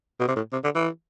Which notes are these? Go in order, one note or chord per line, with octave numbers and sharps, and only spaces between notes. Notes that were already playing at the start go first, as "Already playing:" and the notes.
B2
C3
A2
C3
D3
E3